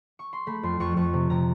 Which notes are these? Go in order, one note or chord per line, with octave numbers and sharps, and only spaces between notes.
C#6
C6
A3 B5
F2 C6
F2 C#6
F2 C#6
C3
C3 A#5